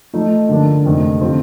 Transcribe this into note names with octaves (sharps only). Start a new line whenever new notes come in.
F3 A3 D#4
D3 F3 A#3 D4
F2 C3 D#3 A3
D3 F3 C4 F4